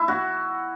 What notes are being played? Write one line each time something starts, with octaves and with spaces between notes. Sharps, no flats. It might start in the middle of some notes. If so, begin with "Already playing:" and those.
Already playing: E4
F#4